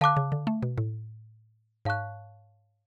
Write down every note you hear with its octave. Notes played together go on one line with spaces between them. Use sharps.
D3 F5 A5 D6 F#6
C#3
D3
A3
B2
A2
G#2 C#5 F5 A5 C#6 F#6